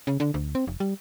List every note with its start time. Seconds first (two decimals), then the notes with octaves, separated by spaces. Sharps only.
0.07 C#3
0.20 D3
0.34 D2
0.55 C4
0.67 F1
0.80 G3